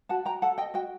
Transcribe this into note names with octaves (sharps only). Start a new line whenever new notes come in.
F#4 F#5 A5
G5 A#5
A4 F#5 A5
D#5 G5
F#4 D#5 G5